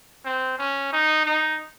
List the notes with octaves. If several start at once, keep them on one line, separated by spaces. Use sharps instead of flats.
C4
C#4
D#4
D#4